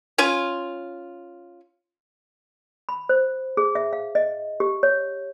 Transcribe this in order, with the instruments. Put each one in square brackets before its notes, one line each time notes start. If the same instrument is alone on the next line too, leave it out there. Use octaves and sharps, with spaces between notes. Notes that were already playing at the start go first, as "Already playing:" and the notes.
[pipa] C#4 F4 G#5
[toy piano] B5
C5
G#4
E5
F5
D#5
G4
C#5